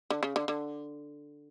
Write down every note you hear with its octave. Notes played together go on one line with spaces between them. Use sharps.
D3
C#3
D3
D3